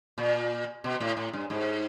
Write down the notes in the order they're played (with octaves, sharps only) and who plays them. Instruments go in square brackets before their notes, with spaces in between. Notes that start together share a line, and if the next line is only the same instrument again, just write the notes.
[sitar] A#2
B2
A2
A2
G2
G#2